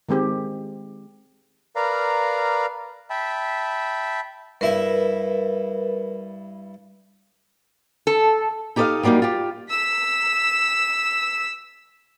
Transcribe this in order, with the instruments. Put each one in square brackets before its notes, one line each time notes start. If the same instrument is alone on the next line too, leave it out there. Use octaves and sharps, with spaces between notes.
[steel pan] D#3 G#3 C4 G4
[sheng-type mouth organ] A#4 B4 D5 F5 A#5
E5 G5 A5 B5
[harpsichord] G2 E4 E5 [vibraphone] A#4 B4
[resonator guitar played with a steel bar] A4
[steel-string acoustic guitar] D#4 G4 A4 C5 D#5 F5
F#3 G3 A#3 C#4 D#4
F4 G4
[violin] E6 B6